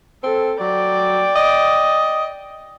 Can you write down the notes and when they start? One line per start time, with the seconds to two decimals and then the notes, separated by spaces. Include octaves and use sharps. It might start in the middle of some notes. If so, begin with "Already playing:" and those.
0.23 C4 A4
0.60 F#3 D5 G5
1.36 D#5